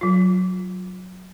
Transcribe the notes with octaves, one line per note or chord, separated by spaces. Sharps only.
F#3 F4